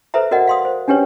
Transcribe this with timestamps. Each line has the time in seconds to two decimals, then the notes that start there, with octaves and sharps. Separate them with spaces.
0.14 A4 B4 C5 E5 A#5
0.31 F#4 A#4 D5 D#5 F#5
0.47 F5 C6 D#6
0.65 C5
0.88 C#4 D4 G4 B4 C#5